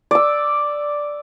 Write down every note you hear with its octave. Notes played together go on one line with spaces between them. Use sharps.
D5 E6